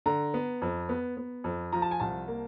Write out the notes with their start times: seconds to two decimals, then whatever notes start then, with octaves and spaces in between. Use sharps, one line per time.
0.06 D3 A#5
0.34 B3
0.62 F2
0.89 B3
1.17 B3
1.44 F2
1.73 F3 A#5
1.82 A5
1.91 G#5
2.00 C2 A5
2.28 A#3